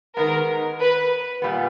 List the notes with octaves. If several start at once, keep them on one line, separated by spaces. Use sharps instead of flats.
D#3 G#3 B3 A#4
B4
A#2 G3 B3